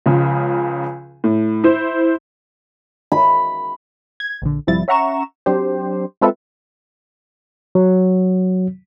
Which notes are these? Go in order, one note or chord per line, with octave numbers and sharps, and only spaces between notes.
C#2 C#3 F3
A2
E4 C5
B5
G#6
A#1 D3
G1 C3 F3 G3 E4 A6
C#4 E5 F#5 A#5 C#6 E7
F#3 C4 D4 G4 C5
G#3 C4 F4 A4 B4 E5
F#3